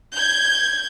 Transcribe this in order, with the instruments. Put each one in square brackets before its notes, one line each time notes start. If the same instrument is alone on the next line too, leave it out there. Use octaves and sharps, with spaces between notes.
[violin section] G6 G#6